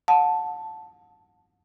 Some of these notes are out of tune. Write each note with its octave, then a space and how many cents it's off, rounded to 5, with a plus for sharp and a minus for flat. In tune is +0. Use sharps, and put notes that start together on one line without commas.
F#5 -35 A5 +0